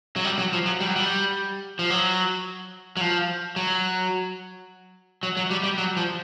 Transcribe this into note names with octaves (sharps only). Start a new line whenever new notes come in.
F#3
G3
F#3
F3
F#3
G3
F#3
G3
F3
F#3
F#3
F3
F#3
F#3
F#3
G3
G3
F#3
F3